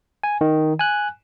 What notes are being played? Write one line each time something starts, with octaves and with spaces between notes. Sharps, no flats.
G#5
D#3
G#5 F#6